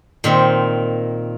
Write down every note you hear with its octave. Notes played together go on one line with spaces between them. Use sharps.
A#2 D#3 C4